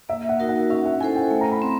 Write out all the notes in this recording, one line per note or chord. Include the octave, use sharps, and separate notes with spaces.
A#3 E5
F#5
D#4 F#4 A#4
F#5
C#4 E5
F#5
E4 A4 C5 G#5
G5
A3
A#5
B5
C4